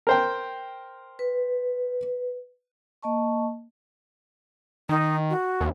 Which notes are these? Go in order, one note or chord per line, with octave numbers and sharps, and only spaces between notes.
A#4 C5 G5
B4
A#3 D#5 A5 C#6
D#3 D#4
F#4
D#2